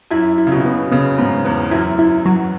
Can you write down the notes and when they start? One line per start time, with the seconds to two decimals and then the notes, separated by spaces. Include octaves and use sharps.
0.11 F#2 E4
0.38 E4
0.47 C#3
0.52 B2
0.65 B3
0.91 C#3 B3
1.18 G#2 B3
1.45 E2 B3
1.71 F#2 E4
1.99 E4
2.25 F#3